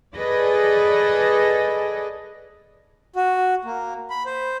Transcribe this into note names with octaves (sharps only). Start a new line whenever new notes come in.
G#4 A4 B4 D5 D#5
F#4
A#3
B5
C5